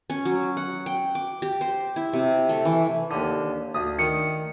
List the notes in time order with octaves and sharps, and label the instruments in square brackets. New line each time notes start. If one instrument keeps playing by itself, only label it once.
[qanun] C#4
F#3
F#5
G5
D6
G4
C5
E4
C3
A3
E3
[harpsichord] D#2 D3
[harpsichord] D2 [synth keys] D#6
[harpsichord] D#3 [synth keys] C#7